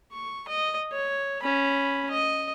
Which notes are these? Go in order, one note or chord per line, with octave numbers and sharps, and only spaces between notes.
C#6
D#5
C#5
C#4 B5
D#5